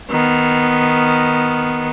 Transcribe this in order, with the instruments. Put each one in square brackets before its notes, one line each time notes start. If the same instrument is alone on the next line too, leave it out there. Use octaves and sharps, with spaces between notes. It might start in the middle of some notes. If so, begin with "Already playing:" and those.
[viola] D#3 B3